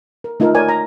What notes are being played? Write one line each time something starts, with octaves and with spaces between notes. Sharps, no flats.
A#4
A3 D#4 F4 A4 A#4
A#4 C#5 D5 G#5
A#5